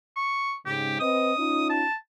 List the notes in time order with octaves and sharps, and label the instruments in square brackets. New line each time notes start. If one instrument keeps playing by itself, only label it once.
[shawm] C#6
[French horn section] G#2 C#3 [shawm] G4
[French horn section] C4 B4 D#5 [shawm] D#6
[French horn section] C#4 D#4 F4
[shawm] A5